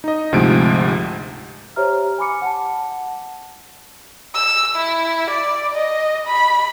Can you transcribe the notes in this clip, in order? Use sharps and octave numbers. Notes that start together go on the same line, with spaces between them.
D#4 D#5
D2 G#2 C3 F3 D7
G4 C5 C#5 E5 A#5 F6
G#5 B5 D6 C#7
F#5 A5
E6
E4
D5
D#5
B5